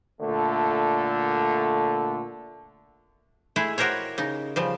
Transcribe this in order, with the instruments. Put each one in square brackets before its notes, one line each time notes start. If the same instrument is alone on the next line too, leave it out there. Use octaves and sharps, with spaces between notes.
[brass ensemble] A#2 D3 A3
[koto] G#3 A3 E4 G#4
F#4 G4 A#4 C5 C#5
C#3 D#4
C#3 F3 G3